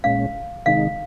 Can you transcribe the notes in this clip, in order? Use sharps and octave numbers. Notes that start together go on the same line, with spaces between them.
A#2 G#3 C#4 F5
C3 D#3 G#3 D#4 F5